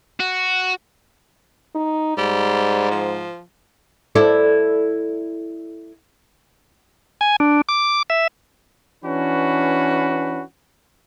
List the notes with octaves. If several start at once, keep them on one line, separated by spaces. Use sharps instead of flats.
F#4
D#4
G#2 G3
F3
E4 A4 D5
G#5
D4
D6
E5
E3 C#4 D4 F#4 B4